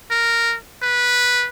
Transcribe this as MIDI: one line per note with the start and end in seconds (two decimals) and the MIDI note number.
0.10 0.55 70
0.82 1.47 71